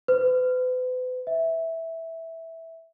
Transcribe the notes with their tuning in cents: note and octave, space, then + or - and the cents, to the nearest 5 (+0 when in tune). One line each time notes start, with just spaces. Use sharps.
B4 +40
E5 -10